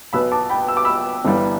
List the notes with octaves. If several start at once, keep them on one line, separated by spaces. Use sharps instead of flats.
B1 B2 B3 B5 E6
A5 D6
G5 B5
E6
D6
B5 E6
G1 G2 E3 G3 B3